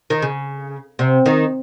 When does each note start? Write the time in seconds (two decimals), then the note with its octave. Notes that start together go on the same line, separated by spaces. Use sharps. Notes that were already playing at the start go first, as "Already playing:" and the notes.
0.10 D#3
0.22 C#3
0.99 C3
1.26 D#3